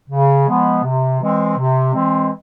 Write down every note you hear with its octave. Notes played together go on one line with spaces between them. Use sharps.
C#3
F3 G#3 B3
C3
E3 G#3 C4
C3
E3 G#3 C4